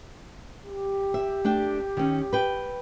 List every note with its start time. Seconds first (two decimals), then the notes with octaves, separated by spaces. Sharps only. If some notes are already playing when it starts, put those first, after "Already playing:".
0.66 G4
1.14 E5
1.45 A3 D4 G5
1.97 D#3 C#4
2.33 B4 G5